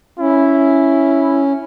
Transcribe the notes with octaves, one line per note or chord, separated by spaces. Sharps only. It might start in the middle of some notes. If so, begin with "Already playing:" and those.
C#4 E4